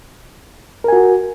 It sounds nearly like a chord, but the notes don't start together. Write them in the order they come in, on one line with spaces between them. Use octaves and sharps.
A#4 G#5 F#4